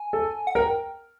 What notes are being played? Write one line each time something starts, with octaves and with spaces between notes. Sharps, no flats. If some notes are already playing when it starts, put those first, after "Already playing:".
Already playing: G#5
A4
F#5
A#4 G5